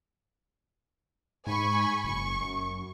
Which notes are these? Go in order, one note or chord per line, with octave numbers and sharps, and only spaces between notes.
G#2 G#5 B5 C#6
F#1 C#6
F#2